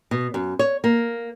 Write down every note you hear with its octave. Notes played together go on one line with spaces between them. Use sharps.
B2
F#2
C#5
A#3